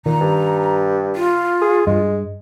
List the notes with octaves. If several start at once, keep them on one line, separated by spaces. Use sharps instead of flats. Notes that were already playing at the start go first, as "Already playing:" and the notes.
A#2 D#3 A#5
G2
F4
G#4
G2 G#3